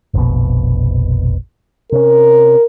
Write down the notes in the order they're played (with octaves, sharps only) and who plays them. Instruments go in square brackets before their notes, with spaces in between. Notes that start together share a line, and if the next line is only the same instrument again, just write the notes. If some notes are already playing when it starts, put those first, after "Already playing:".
[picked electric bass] F1 A#1 B2
[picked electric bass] C3 C#4 [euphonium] A#4